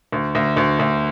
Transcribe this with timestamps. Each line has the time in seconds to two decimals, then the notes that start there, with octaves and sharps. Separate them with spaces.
0.12 D2
0.35 D2
0.57 D2
0.79 D2